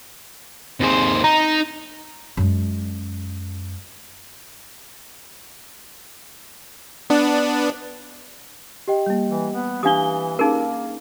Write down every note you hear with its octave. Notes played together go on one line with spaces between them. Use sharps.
D#2 C4 G#4 C5
D#4 A#5
F#2 G#3
B3 D4
G4 D#5 G5
G3 A#3
E3
B3
E3 D4 G4 F5 D#6 G7
A#3 C#4 D#4 G#4 A#4